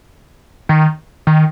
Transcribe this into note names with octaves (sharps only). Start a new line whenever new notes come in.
D#3
D#3